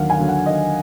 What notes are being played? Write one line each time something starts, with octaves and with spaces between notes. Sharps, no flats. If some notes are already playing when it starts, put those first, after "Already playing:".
Already playing: D#2 D3 F#3 F5 F#5
G#5
D3 F#3
F#5
D#2 D#5